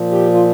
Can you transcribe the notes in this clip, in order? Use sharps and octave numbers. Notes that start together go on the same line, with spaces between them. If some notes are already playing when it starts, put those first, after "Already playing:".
Already playing: A#2 F3
G4
F4